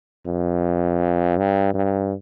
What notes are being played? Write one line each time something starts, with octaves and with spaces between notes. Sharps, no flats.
F2
G2
G2